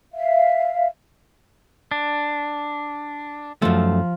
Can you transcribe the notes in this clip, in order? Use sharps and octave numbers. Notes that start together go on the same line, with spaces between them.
E5 F5
D4
F#2 F3 A3